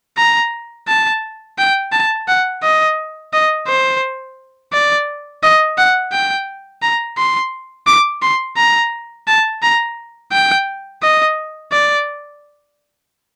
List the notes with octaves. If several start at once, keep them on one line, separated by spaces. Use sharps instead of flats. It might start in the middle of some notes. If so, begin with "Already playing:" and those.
A#5
A5
G5
A5
F#5
D#5
D#5
C5
D5
D#5
F#5
G5
A#5
C6
D6
C6
A#5
A5
A#5
G5
D#5
D5